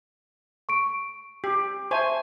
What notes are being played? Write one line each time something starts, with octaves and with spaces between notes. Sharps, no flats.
C#6 D7
G4
C5 E5 G#5 A5 C#6